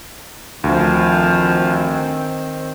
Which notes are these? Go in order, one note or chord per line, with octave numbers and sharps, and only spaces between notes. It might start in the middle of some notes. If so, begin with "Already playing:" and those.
D2 D#3 F3 C4